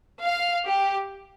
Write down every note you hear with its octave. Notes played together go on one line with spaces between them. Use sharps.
F5
G4